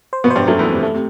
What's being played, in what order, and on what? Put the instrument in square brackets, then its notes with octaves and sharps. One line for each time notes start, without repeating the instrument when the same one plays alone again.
[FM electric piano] C5
[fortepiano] B2 B3
[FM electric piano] C5
[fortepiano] G2 G3
[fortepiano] F#2 F#3 [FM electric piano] A3
[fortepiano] E2 E3
[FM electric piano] A3
[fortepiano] C3
[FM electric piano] A3
[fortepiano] C3